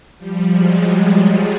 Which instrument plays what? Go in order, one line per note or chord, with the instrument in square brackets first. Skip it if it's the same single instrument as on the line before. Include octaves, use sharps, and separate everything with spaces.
[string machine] F3 G3
F#3 G#3
F#3 G#3